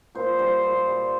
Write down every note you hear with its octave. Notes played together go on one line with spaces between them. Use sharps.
A#2 C5
G3 C5
A#2
G3